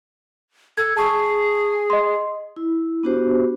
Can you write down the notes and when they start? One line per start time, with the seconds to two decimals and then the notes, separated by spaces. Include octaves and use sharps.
0.78 A4 G#6
0.97 G#4 A5 C#6
1.90 D#5 C6
2.56 E4
3.03 B3 D4 F#4 G4 C5